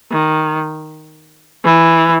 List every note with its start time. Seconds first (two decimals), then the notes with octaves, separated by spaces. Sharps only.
0.11 D#3
1.65 E3